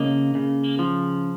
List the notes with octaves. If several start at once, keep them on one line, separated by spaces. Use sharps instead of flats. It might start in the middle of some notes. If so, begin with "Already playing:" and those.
Already playing: C#3 A#3 D#5
C#3
F3